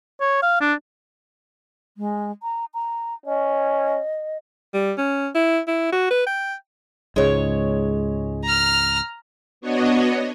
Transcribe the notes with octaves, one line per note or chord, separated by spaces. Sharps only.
C#5
F5
D4
G#3
A#5
A#5
C#4 D#5
G3
C#4
E4
E4
F#4
B4
G5
C#2 G#2 G#3 C#5
A#5 F6
B3 D4 F#4 C#5 D#5